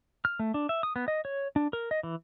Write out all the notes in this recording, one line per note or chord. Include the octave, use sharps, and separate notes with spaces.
F6
A3
D4
E5
D#6
B3
D#5
C#5
D4
A#4
D#5
E3